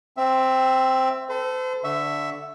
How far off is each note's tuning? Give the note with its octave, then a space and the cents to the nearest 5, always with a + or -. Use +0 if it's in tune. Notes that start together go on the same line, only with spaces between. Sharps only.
C4 +0 E5 +10
A4 +0 C5 -40
D3 -5 E5 +5 C#6 +5